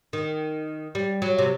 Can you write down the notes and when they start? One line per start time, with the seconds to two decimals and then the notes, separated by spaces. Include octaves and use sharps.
0.13 D#3
0.95 G3
1.22 F#3
1.38 C3